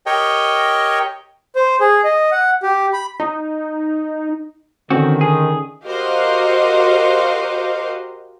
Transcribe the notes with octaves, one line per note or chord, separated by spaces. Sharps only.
G4 A#4 C#5 D#5 G5
C5
G#4
D#5
F#5
G4
B5
D#4
D3 D#3 C4 C#4 F#4
G#4
F#4 G4 A#4 C5 D#5 F5